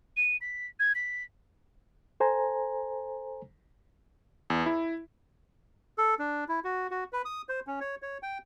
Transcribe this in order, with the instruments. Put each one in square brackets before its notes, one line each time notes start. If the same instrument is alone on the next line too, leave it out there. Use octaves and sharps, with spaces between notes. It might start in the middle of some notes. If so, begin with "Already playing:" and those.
[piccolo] D#7
B6
G#6
B6
[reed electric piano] A4 C5 G#5 A#5
[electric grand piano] E2
E4
[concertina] A4
D4
E4
F#4
F#4
B4
D#6
C5
C#4
C#5
C#5
G5